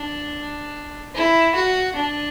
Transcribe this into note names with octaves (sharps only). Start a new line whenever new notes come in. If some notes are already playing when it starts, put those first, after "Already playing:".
Already playing: D4
E4
F#4
D4